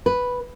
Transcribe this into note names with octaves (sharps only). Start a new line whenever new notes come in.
B4